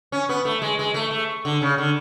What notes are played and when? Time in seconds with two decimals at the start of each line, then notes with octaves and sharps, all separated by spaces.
0.12 C#4
0.29 B3
0.45 A3
0.62 G#3
0.79 G#3
0.94 A3
1.11 A3
1.45 D3
1.62 C#3
1.78 D3